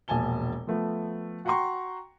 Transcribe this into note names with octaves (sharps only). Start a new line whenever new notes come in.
E1 A#1 G#5 A5 G7
F3 A3 B3
F#4 F#5 G5 A#5 C6 C#6